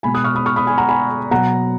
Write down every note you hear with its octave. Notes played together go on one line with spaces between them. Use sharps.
B2 G#3 G#5 B5
D#6 F#6
C#6 F6
B5 D#6
C#6 F6
B5 D#6
G#5 B5
F#5 A#5
G#5 B5
B2 F#3 F#5 A#5